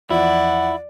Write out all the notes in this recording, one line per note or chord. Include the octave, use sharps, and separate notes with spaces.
E2 F3 E4 D5 F#5